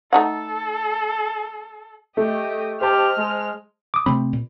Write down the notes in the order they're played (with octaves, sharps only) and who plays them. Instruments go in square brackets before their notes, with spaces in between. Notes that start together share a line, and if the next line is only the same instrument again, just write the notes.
[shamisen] A3 D#4 F#5 [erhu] A4
[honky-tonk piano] A3 [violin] G4 D#5
[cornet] G4 [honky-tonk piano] C5 A5 [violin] D#5 F6
[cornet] G#3
[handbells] D6 D#6
[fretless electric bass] C3 A3 C4 [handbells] B5
[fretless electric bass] A#2